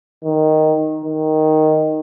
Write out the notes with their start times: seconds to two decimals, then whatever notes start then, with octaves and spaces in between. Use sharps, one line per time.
0.24 D#3
1.05 D#3